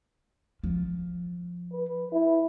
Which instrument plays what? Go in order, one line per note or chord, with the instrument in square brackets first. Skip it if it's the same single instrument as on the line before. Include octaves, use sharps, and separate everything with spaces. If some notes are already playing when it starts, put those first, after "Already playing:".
[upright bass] F3
[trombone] B4
E4